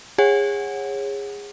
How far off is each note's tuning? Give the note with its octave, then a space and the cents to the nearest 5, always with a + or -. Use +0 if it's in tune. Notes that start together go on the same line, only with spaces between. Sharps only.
G#4 -25 C#5 -20 F#5 +0